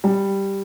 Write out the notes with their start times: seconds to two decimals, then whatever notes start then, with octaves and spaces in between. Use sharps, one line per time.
0.04 G3